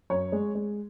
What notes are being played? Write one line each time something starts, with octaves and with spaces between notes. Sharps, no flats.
F#2 C#5
G#3
G#3